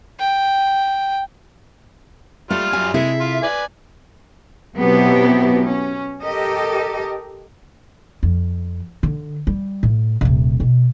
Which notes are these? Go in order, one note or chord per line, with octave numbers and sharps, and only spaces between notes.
G5
G3 A3 F4 F6
F#2 G#5
C3 G#3 E4 G#4 A4 E5
F4
B4 D5 G#5
B2 F#3 B3 C4 E4 G4
C#4
G4 A4 A#4 D#5
F2
D3
G3
A2
D#1 C3
B2